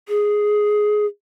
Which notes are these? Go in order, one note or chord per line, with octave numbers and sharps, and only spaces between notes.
G#4